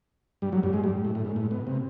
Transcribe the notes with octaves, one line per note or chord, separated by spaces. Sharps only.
G2 G3
F#2 F#3
G2 G3
G#2 G#3
G2 G3
A2
A2
G#2
A2
B2
C3